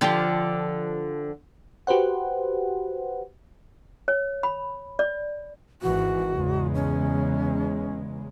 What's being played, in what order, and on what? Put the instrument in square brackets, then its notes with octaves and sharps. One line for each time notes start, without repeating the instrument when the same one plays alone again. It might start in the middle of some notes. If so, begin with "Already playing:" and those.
[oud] D3 F3 G4
[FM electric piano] F#4 G4 B4 C5 F#5
[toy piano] C#5
B5
D5
[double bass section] G#1 G#2 E3 [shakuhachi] F#4
[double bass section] E2 C#3 G#3
[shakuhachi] C#4